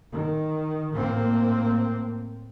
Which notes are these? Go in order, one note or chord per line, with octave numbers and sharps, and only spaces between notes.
D#3
A2 A#3 C4